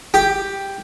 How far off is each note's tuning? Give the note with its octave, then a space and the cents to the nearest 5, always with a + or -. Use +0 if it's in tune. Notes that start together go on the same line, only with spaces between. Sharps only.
G4 +5